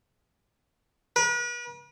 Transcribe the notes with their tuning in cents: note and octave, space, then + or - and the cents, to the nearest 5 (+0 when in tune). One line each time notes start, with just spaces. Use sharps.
B4 -40